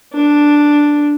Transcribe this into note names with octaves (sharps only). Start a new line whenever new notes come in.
D4